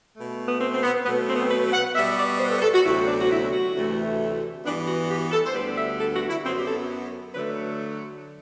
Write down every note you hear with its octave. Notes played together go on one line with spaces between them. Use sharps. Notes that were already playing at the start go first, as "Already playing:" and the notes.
B2 A3
B3
C4
C4
B3
B2 F#3 A3 B3
C4
B3
C4
B4
F#5
B2 G3 B3 E5
D5
C5
A4
A4
F#4
D2 C3 F#3 B3 E4
D4
F#4
E4
F#4
D2 C3 E3 A3
G2 E3 B3 D4
F#4
F#4
G4
A4
C5
D2 D3 G3 B3 B4
E5
A4
F#4
E4
F#2 F#3 B3 C4
G4
A4
D3 F#3 A3 B4